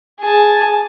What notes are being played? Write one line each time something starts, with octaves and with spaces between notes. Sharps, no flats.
G#4 A5